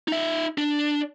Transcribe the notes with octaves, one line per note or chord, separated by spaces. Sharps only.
D#4 E5
D4